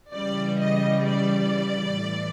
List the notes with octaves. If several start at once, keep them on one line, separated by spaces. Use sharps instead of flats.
C#3 E3 G3 D5
D#5
D5
A2 E3